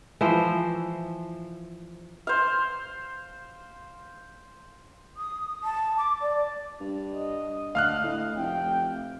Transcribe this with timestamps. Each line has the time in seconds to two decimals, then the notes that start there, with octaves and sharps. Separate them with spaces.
0.21 E3 F3 C5
2.27 C5 F5
5.17 D#6
5.64 A5
5.98 D6
6.21 D5
6.81 G2
7.14 D#5
7.75 D2 F5 F6 F#6
8.04 A2
8.37 F1 G5